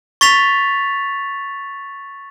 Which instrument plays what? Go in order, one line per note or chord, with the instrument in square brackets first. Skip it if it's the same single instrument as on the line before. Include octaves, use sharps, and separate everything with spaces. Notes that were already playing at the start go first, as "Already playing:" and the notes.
[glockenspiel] C#6 A6 B6 F7